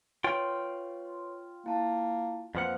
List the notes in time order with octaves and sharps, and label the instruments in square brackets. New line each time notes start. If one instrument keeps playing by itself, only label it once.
[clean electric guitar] F4 G5 [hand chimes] B4 C#5 C6
[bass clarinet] A#3 [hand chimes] E4 A5
[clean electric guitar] F2 F3 F#5 [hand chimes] A#3 B4 C5